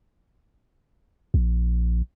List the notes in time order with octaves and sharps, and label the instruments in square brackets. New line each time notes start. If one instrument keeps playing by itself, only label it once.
[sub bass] A#1